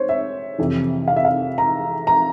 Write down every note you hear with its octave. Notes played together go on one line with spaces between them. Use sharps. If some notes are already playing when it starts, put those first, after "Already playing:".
Already playing: C5 C#5
E5
F2 C3 E3
F5
E5
F5
A#5
A#5